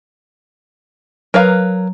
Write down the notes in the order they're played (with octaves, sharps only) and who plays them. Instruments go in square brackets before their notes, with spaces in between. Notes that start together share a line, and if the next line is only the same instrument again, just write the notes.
[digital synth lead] F#3 [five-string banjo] A#4 B4 F5